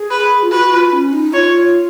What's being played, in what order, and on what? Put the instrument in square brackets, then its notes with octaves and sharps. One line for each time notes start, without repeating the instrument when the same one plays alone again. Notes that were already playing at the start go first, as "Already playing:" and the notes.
Already playing: [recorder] G#4
[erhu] B4
[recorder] F4
[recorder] F#4 [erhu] B4
[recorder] F4
C#4
D#4
[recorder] F4 [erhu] C#5